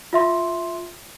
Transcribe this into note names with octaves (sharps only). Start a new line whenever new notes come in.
F4 E5 C6